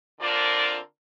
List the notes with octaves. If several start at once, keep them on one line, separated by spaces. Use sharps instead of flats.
D3 C4 D4 F4 A#4 D5